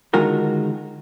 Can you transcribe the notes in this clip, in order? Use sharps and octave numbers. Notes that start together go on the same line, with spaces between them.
D3 D#3 G#3 F4 F#4 A#4